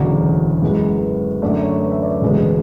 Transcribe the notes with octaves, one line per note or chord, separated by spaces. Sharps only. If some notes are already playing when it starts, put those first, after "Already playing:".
Already playing: E1 D2 C#3 F#3 D5
F#2 E3 G#3 B3
F#2 D3 A3 D5
C#5
B4
E5
D5
E1 D2 C#3 G#3 B4